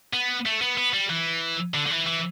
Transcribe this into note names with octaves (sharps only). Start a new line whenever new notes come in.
B3
A3
B3
B3
G3
E3
D3
D3
E3
E3